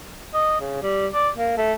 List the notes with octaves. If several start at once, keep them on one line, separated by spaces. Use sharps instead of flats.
D#5
C#3
G3
D5
A#3
A3